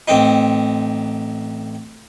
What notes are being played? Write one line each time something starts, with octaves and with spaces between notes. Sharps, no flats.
A1 C4 D#4